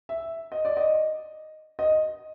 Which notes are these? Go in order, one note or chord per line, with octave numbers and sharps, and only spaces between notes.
E5
D#5
D5
D#5
D#5